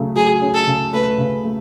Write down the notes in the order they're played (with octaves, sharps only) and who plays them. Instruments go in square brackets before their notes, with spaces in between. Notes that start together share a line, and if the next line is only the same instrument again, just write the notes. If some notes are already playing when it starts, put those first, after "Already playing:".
Already playing: [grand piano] C#3 F#3 A3
[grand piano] F#3 [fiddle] G#4
[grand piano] C#4
[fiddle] A4
[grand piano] C#3
[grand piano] A3 [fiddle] B4
[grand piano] C#3
A3